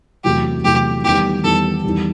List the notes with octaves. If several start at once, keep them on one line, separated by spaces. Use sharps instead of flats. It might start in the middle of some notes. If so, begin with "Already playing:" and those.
E2 C3 F#3 A3 E4 G4
E2 C3 F#3 A3 E4 G4
E2 D#3 G3 B3 G4
E2 D#3 G3 B3 A4
E2 D#3 G3